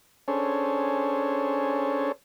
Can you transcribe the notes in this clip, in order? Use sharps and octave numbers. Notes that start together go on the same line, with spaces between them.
C#4 D4 G#4 A4 C5 C#5